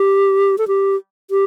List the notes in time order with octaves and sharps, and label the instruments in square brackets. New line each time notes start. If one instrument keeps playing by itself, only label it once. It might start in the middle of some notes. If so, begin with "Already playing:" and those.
Already playing: [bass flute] G4
A4
G4
G4